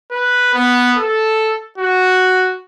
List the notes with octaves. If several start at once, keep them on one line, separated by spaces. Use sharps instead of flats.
B4
B3
A4
F#4